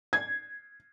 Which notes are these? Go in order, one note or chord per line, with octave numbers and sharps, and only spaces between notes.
G#6